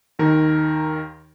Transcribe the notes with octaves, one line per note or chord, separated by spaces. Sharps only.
D#2 D#3 A#4